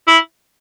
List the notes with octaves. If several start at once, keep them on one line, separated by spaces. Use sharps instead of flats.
E4